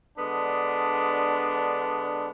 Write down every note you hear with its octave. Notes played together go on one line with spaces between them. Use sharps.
D3 G#3 B3 D4